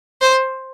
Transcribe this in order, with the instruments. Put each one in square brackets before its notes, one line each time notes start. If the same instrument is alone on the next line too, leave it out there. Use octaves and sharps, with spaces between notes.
[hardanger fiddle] C5